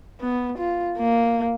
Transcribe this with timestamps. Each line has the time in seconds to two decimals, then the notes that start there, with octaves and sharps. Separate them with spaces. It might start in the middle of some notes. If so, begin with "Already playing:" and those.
0.21 B3
0.58 F4
0.98 A#3